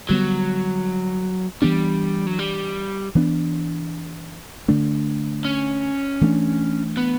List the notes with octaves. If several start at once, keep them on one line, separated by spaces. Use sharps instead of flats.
D3 F#3 G3 B3
E3 G3 B3 D4
F#3
G3
E3 B3 D4
D3 A3 D4
C#4
E3 A3 D4
B3